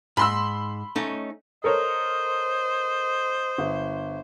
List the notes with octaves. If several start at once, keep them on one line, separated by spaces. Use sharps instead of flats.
G#2 B5 C6 E6
A3 C#4 D#4
A4 A#4 C5 C#5 D#5
G1